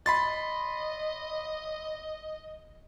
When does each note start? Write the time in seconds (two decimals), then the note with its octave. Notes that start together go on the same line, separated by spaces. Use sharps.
0.06 D#5 B5 C6 A6